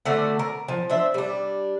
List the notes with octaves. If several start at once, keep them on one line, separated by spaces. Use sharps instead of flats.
D3 A3 F#4 D5
A#4
F3
D4 C5 E5
G3 D4